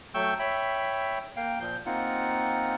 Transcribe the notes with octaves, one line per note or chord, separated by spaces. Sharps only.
F#3 A3 G5 C#6 E6 G6
C#5 E5 G5 B5
A#3 F5 G5
A#2 F3 G6
A#3 C4 D#4 F4 F#5